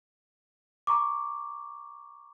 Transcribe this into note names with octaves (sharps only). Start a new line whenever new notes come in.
A#5 C#6 D6